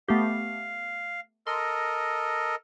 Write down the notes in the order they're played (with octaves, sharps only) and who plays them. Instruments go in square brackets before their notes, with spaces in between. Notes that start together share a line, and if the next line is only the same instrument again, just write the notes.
[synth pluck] A3 B3 G4 [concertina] F5
[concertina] A4 A#4 D#5 [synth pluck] C6